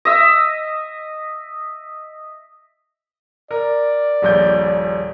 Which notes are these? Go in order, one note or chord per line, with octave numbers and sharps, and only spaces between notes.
D#5 E5
A#4 D5
D#1 A#1 G6